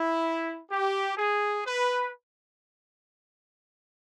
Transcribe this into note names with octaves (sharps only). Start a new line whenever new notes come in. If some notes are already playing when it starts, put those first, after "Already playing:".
Already playing: E4
G4
G#4
B4